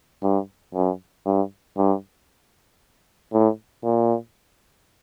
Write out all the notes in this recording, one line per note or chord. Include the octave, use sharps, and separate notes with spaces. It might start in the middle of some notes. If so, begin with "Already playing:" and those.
G2
F#2
G2
G2
A2
A#2